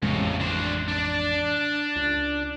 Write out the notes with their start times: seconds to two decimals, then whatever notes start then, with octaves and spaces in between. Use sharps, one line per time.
0.02 A1 F2 A2 C#3 G#3
0.40 D4 C5
0.88 D4 D5
1.96 C#2